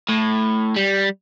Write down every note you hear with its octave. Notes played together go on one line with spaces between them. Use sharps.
A2
G3